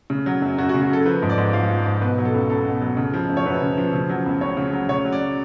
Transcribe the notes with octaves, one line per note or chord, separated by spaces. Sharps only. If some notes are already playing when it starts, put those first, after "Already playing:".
C#3
F#3
F#2
F#2 F#4
F#4
C#3
F#4
F#3 A4
F3 B4
G#2
D5
G#2
F3 F5
F3
G#2
B2 B4
F#3
A4
C#2
C#2 A4
B2
F#3
C#3
F3
F#2
C#5
F#2 B4
C#3
F3
C#3
F#3
C#2
C#2 C#5
C#3
F#3
C#3 C#5
F#3
D5